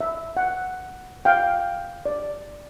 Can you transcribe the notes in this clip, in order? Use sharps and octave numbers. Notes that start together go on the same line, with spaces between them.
E5
F#5
F5 G5
D5